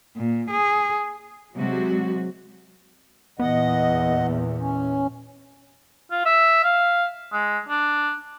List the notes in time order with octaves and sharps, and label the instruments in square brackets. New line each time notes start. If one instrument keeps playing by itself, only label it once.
[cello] A#2
G#4
[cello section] C3 F#3 G#3 F#4
[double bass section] E2 A#2 [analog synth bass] B3 [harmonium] D#5 F#5
[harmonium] C#4
[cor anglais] F4
E5
F5
G#3
D4